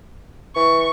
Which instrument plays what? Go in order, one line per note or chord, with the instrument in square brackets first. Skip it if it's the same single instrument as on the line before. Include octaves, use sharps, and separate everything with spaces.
[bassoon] E3 [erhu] C#6